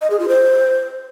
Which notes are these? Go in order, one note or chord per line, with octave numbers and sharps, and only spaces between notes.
D#5
G#4
F4
C5